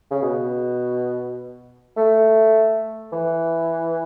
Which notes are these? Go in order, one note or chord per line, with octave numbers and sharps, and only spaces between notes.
C#3
B2
A3
E3